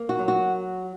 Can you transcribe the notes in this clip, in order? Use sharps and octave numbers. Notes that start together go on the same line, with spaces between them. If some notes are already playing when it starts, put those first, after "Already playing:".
Already playing: A#3
F#4
F#3
F#4